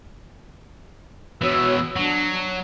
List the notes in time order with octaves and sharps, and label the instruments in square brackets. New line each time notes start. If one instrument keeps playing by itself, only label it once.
[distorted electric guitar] B2 E3 [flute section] F#4 C#5 E6
[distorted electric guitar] F#3 [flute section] D4